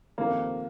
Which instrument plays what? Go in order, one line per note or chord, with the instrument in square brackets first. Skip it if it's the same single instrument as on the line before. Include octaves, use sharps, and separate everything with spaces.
[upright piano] F2 C3 D#3 A#3